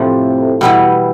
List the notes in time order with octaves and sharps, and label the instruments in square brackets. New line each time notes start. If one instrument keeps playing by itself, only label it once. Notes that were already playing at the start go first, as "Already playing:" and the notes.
Already playing: [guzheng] A2 F3 A3 [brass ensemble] C3
[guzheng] B2 G3 B3 E4 [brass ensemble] E3